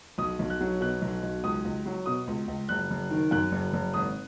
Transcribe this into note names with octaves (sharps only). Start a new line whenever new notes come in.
B1 D#6
B1
F#6
F#3
B2 F#6
B1
B1
C#2 D#6
C#2
F#3
B2 D#6
C#2
C#2
F#1 F#6
F#1
D#3
F#2 F#6
F#1
F#1
G#1 D#6